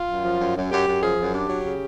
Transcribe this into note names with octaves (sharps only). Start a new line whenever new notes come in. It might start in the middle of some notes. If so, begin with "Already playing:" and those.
Already playing: F4
F#2
F3
F#2
F#2
F#2 G4
F#2
F3 G#4
F#2
D4 G4
F#3
C#3